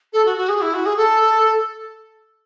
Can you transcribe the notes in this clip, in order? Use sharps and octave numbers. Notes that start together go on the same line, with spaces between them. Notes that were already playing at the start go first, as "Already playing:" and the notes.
A4
F#4
F#4
G#4
E4
F#4
G#4
A4